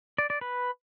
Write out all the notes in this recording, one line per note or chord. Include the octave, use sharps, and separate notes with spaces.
D5
D5
B4